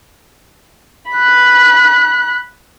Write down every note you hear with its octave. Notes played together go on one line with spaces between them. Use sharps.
B5 F#6